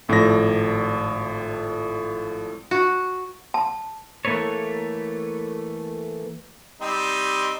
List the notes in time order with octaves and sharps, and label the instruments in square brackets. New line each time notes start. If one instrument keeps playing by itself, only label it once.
[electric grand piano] G#1 A2 F3 A4 D5 A#6
[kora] F#4
[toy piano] A5
[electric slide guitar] E3 A3 A#3 A4 B4 C#5
[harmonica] G3 C4 D#4